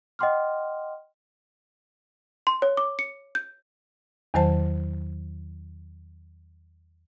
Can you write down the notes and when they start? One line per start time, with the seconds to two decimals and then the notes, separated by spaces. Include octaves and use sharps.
0.19 D#5 F#5 G5 C6 D6 F6
2.47 C6
2.62 C#5
2.77 D6
2.99 C#7
3.35 G6
4.34 E2 D#3 F#3 C5 A5